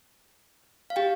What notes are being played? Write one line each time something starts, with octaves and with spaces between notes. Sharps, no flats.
F5
G4 G5